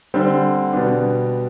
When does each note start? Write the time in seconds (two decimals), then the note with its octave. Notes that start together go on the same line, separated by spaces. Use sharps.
0.14 D3 G3 C4
0.73 B2 G3 B3 D4